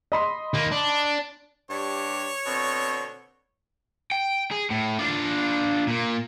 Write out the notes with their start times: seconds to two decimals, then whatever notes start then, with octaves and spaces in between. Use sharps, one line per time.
0.12 D#5 B5 C6
0.54 D#3 A#3
0.72 D4
1.70 G2 D4 G4 C#5
2.46 B2 D3 C4
4.11 G5
4.52 G#4
4.71 A2
4.99 D4 F4
5.87 A#2 A#3